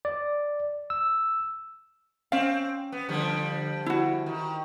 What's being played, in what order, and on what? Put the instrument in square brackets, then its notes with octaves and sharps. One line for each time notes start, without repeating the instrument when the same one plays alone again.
[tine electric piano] D5
E6
[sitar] C4 [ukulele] C#4 F5
[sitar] B3
D3 F3 G3
[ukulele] E4 F#4
[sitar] D#3